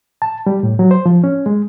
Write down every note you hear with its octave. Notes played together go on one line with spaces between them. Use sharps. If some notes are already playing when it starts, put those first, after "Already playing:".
A5
G3
A2
F#3
C5
F3
C#4
G#3